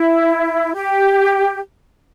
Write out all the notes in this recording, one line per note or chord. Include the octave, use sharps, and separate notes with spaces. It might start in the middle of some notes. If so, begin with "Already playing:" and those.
Already playing: E4
G4